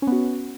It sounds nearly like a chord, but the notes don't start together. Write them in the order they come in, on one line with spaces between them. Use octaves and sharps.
C#4 B3 F#4